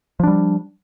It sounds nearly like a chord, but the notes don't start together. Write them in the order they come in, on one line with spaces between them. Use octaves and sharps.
F3 D4 G3